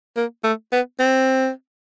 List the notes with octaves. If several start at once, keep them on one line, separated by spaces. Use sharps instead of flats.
A#3
A3
B3
C4